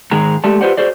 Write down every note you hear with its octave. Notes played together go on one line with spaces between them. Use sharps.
G#2 D#3 G#3 G#4 A#5
G#3 A3 G4 D5 A5
F4 G4 B4 C5 D5 F#5
F#4 G#4 C5 D5